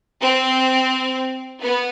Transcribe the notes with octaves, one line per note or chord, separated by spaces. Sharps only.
C4
B3